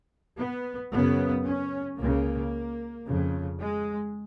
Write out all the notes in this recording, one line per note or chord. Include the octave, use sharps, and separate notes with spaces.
B3
F#2 C#3 B3
C#4
C#2 C#3 A#3
F2 C#3
G#3